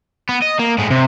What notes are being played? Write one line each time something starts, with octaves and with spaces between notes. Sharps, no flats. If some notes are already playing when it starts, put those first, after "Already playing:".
B3
D#5
A#3
A2 G#3
C3